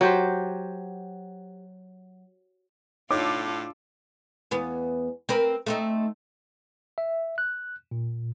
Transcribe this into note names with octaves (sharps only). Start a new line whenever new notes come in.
F#3 G4 C5
A2 D4 D#4 F4 A4 C#5 D#5 D6
E2 B3
C4 A#4 B4
A3 C4 D#4
E5
F#6
A#2